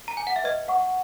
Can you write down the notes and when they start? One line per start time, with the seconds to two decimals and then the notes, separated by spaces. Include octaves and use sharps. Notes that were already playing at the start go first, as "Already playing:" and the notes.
0.08 A#5
0.17 G#5
0.27 F#5
0.36 E5
0.44 B4 D#5
0.68 F#5 C#6